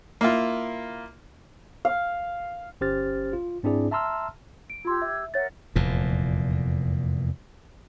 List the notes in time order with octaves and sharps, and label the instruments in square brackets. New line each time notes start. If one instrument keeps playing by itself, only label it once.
[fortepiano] A#3 E4 F4
[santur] F5
[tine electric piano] G1 C#4 G4 C5 F6 A6
F4
G#2 C4 D4 E4 G#4 D5
E5 A5 A#5 C6 E6 F6
[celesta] D7
[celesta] F4 C6 [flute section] G4 E6 G#6
[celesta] E5
[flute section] A#4 E5 F#5 [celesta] C#5 A6
[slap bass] F1 E2 A#2